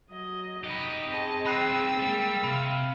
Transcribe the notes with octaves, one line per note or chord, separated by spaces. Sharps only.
F#3 D#5
D#4 G4 D#5 F#5 B5
C4 G#4 D#5 A5
D#4 F4 G5 B5 E6 F#6 C7
G3 G#3 A#3
C3 F5 B5